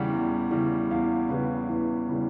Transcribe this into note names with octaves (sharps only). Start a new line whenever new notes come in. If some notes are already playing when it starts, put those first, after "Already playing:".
Already playing: E2 C#3 E3 G3 F#5 G5
E2
C#3 E3 G3
E2 F5
C#3 E3 G3 B4
E2 B4
C#3 E3 G3